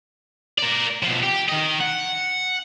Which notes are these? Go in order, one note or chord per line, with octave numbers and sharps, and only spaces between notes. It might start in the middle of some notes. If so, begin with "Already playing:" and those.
A#4 D5
B2 F3
G4
D#3 D#5
F#5